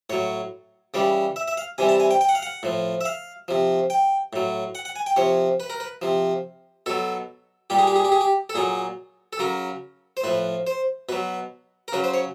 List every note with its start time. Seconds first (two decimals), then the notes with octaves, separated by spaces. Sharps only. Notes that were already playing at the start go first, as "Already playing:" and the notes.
0.10 A2 F#3 C#5
0.94 C#3 E3 G3 D5
1.36 E5
1.48 E5
1.57 F5
1.78 C3 E3 G3 G#5
1.89 A5
2.00 G#5
2.11 G5
2.21 G5
2.29 F#5
2.35 F5
2.43 F#5
2.63 A2 F3
3.01 E5
3.05 F5
3.48 C3 F3
3.90 G5
4.33 A2 F#3
4.75 F#5
4.85 F#5
4.96 G#5
5.06 G5
5.16 C3 F3 C#5
5.60 B4
5.70 A#4
5.80 B4
6.02 C3 F3
6.86 B2 F#3 A4
7.70 A#2 G3 G4
7.79 G#4
7.87 G4
7.96 G#4
8.05 G4
8.12 G#4
8.21 G4
8.50 A4
8.55 A#2 F#3 G#4
9.33 A4
9.39 C#3 F#3 A#4
10.17 C5
10.24 A2 F3 B4
10.67 C5
11.09 B2 F#3 B4
11.88 A#4
11.93 C#3 F#3 B4
12.04 C5
12.14 C#5